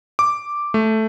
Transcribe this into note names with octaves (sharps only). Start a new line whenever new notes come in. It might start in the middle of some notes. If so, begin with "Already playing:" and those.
D6
A3